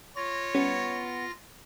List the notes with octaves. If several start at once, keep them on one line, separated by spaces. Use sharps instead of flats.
F4 C#5 A#6
G3 B3 C#4